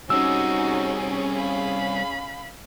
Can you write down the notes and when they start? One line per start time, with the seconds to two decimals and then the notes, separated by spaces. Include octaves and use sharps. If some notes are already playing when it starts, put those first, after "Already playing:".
0.10 G3 C4 C#4 D#4 F#4 G#4 E6
1.36 F5 B5